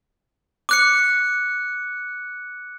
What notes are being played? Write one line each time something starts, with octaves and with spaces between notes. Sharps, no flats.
D6 F#6 C#7